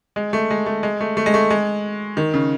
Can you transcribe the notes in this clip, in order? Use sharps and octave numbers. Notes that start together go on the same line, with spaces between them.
G#3
A3
G#3
A3
G#3
A3
A3
G#3
A3
G#3
D#3
C#3